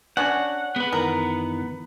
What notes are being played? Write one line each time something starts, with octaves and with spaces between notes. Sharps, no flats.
C#4 D4 F#4 F#5
B3 G#4 B4
F#2 D#3 E3 A#4